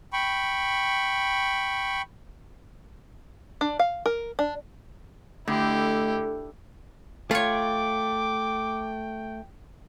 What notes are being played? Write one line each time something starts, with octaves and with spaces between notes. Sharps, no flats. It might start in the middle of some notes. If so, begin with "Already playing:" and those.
G5 B5 C#6
D4
F5
A#4
D4
D3 A3 E4 G4
A3 F4 C#5 G5 D6